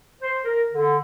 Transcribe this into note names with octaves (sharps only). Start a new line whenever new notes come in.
C5
A#4
D3